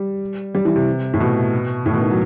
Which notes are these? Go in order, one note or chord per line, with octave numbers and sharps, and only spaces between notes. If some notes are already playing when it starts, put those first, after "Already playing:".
Already playing: G3
G3
E3
C3
A2
B2
A2
B2
D#3
F#3